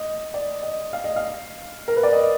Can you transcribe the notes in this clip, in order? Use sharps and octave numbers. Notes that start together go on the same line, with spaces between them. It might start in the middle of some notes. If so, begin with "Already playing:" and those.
Already playing: D#5
D5
D#5
F5
D#5
F5
A#4
B4
D5
D#5